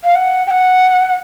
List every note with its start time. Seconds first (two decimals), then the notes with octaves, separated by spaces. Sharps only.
0.03 F5
0.15 F#5
0.46 G5
0.50 F#5